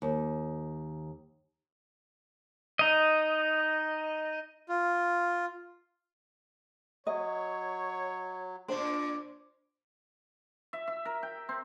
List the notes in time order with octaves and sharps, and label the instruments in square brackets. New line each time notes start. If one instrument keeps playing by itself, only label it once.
[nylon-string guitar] D#2
[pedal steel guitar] D#4 D#5
[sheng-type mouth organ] F4
[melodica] F#3 [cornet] C#5 [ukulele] D#5
[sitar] A#2 D4 [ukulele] C5
[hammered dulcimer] E5
E5
A#4
G5
C4